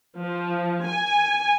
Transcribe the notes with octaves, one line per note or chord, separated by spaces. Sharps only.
F3
G#5